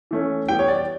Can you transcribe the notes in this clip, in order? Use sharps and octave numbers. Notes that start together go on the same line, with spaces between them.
E3 A3 C#4
E3 G3 B3 G5
C#5
D5